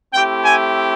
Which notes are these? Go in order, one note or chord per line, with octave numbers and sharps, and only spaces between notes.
A3 C4 E4 G4 G5
G#5